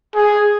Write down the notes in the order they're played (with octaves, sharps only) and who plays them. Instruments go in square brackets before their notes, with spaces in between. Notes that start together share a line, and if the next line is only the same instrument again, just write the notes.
[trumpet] G#4